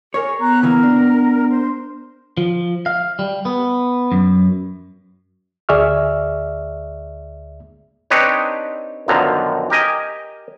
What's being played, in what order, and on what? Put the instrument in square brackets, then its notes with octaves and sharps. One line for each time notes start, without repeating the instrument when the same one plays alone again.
[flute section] G#4 C#6 [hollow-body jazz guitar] A#4 C#5
[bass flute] B3 [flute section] A#5 F#6
[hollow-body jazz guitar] C#3 E3 A#3 [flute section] A#4
[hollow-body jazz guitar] D4
[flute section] C5
[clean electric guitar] F3
F5
G3
B3
F#2
[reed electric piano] D2 G#4 D5 E5 C#6 F6
[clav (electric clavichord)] C4 D4 D#4 G4 B4 C#5
B1 F#2 D3 D#3 F3 A#5
G4 A#4 D#5 G#5